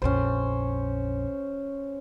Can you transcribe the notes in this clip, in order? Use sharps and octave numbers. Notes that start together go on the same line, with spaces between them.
A#1 F2 C#4 C5